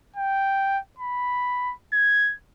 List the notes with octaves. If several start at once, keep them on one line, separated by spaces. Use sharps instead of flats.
G5
B5
G#6